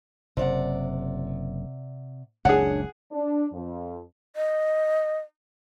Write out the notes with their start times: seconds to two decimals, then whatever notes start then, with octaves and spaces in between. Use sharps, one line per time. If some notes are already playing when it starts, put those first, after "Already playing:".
0.37 F#1 C3 D5 F#5
2.45 F#1 C#2 A#2 D4 G#4 C#5 F#5
3.11 D4
3.53 F2
4.36 D#5